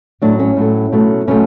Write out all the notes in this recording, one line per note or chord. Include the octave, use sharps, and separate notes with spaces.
A2 F#3 A3 D4
C#4
A2 F#3 A3
B2 F#3 A3
B2 F#3 A3 C#4